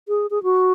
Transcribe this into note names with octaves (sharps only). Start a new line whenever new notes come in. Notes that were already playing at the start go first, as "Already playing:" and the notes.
G#4
G#4
F#4